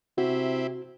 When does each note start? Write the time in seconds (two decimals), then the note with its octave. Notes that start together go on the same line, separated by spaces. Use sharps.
0.18 C3 C4 E4 F#4 G4